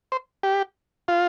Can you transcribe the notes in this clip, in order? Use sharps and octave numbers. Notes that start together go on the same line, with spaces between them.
C5
G4
F4